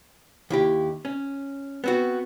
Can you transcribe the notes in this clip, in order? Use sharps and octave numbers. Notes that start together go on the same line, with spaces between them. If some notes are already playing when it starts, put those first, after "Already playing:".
D#2 E4 G4
C#4
B3 C4 F#4